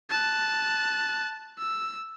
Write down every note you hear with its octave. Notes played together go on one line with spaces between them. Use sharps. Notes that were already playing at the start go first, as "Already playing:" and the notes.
A5 F#6
E6